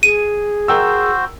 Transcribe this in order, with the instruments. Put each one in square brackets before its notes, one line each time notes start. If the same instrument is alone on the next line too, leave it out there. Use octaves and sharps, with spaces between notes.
[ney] G#4 [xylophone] D#7
[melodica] F#4 C5 [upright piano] A#4 G5 E6